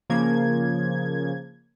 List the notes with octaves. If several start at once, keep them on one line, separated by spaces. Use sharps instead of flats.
C#3 F3 A#3 G#6